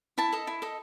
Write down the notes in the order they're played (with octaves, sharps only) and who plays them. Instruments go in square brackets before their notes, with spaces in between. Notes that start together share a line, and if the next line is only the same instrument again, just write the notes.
[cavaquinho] E4 A5
A4 D#5
E4
A4 D#5